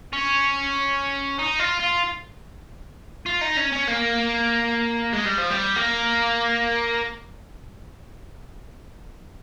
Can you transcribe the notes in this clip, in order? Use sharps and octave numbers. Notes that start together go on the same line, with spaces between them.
C#4
D#4
F4
F4
F4
D#4
C#4
C#4
A#3
G#3
G3
F3
G3
A#3